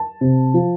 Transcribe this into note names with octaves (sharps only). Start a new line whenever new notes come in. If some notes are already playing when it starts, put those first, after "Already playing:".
Already playing: A5
C3
F3